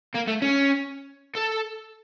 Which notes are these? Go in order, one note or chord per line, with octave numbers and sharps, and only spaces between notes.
A#3
A3
C#4
A4